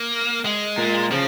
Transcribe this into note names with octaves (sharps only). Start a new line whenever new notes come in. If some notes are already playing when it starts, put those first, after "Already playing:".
Already playing: A#3
G#3
A#2
C#3 F3